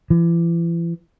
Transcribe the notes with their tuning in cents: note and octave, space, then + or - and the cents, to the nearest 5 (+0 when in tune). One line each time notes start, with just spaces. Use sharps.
E3 +40